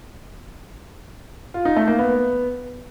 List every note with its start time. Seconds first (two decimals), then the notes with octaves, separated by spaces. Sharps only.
1.54 F4
1.65 D#4
1.76 A3
1.88 A#3
1.99 B3